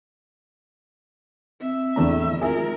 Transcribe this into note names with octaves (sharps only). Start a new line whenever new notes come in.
C4 E5
E2 A2 D4 A#5
G#1 F4 G#4 A#4 E5